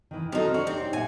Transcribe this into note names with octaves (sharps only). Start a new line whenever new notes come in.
D#3 E3
F3 C4 D#4 F#4 A4
D4 F#4
C4 C#4 D#4 G4
A#2 E5 F#5 G#5